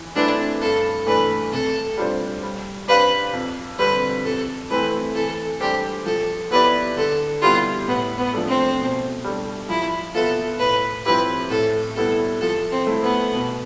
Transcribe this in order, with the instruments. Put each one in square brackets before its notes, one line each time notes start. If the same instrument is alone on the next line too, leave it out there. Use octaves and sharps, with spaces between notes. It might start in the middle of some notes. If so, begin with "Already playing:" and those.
Already playing: [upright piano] E3
[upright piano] A3 C4 E4 B4 [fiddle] D4
[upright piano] G2 [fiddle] A4
[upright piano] E3 A3 D4 [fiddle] B4
[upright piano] C3 [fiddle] A4
[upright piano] G3 D4 F4 C5
G3
[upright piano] D4 G4 C5 F5 [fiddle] B4
[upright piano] F2
[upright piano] D3 G3 C4 [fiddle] B4
[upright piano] F2 [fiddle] A4
[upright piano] E3 A3 C4 E4 [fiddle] B4
[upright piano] E3 [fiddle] A4
[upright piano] G3 D4 A4 C5 [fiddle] G4
[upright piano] F3 [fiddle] A4
[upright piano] B3 E4 G4 D5 [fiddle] B4
[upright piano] D3 [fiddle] A4
[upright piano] G3 B3 E4 G4 [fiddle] F4
[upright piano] A2 [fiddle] B3
[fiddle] B3
[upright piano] F3 A3 D4 A4
[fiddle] C4
[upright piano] B2
G3 D4 A4
[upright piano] F3 [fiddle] E4
[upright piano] B3 F4 B4 E5 [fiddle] A4
[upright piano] A2 [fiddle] B4
[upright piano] F3 C4 E4 G4 [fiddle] B4
[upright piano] A2 [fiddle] A4
[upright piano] G3 B3 E4 [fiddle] A4
[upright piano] F3 [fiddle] A4
[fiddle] C4
[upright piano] A3 E4
[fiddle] B3
[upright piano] B2